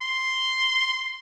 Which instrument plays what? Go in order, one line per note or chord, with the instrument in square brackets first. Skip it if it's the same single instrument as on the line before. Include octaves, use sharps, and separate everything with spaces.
[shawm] C6